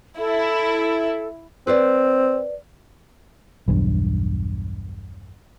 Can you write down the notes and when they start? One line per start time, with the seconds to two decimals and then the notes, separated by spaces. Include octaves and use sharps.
0.19 E4 A4
1.67 C4 B4 C5 D5
3.68 B1 E2 G2